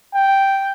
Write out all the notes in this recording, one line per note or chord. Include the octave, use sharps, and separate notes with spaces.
G5